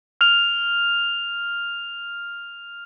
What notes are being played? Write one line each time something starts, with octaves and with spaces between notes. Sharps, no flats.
F6 F7